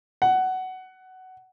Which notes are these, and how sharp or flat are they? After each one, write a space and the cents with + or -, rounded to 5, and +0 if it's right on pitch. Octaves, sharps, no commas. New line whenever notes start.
F#5 +15